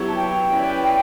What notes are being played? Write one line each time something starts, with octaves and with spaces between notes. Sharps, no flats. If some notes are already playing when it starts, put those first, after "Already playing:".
Already playing: F#3 B3 E4 G4 C#5
A5
G5
C#4 E4 B4 D5
G5